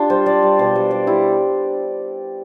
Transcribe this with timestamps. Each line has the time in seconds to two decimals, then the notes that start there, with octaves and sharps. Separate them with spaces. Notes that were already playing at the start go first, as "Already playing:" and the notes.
Already playing: D4 F4 G4
0.10 G3 C5
0.26 G3 D5
0.42 G3
0.58 B2 C5
0.75 G3
0.91 G3 D5
1.07 G3 E4